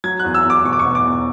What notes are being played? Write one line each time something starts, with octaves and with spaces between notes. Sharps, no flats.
F#3 G#6
F#6
E2
E6
E2
D6
B2 C#6
D6
C#6
B2
D6
E2